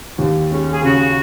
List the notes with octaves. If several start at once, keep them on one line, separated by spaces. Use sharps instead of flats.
D#2
G#3 C#4
G#4
C#3 F#4